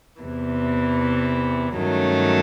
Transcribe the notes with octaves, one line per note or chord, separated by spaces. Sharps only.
E2 C3 E3
G2 D#3 F#3 A3 C#4